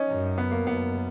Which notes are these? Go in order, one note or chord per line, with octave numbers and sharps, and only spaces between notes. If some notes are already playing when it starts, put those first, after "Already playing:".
Already playing: C#4 D#4
F#2
B3
A#3
F#2 B3